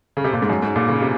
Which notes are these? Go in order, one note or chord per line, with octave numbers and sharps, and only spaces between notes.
C#3
C3
A#2
G#2
F#2
G#2
A#2
C#3
C3